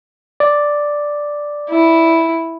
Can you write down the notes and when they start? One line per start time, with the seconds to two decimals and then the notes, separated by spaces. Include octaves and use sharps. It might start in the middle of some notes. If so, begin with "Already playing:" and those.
0.40 D5
1.69 E4